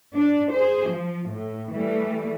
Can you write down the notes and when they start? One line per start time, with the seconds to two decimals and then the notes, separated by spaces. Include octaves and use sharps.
0.16 D4
0.53 G#4 C5
0.88 F3
1.29 A2
1.73 E3 G3 A3